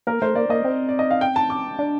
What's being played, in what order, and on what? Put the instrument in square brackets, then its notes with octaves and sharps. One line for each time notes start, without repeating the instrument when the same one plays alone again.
[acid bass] A#3 [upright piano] A#4
[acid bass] A3 [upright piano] C5
[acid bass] A#3 [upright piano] D5
[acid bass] A#3 [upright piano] D#5
[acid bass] C4
[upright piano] D5
D#5
F5
G5
A5
D6
[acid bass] D4